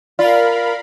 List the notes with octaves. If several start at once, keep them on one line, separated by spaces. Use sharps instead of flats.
F4 A#4 D5 F5 B5